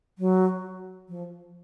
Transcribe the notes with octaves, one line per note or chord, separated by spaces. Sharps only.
F#3
F3